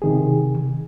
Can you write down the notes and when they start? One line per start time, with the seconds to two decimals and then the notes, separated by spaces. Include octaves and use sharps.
0.02 C3 D#3 G#4